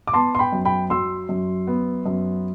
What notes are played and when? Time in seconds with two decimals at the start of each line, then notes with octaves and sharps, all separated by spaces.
0.07 D6
0.14 B3 A5 C6
0.35 C6
0.39 G5 B5
0.53 F#2
0.65 G5 B5
0.90 F#3 C6 E6
1.29 F#2
1.67 B3
2.06 F#2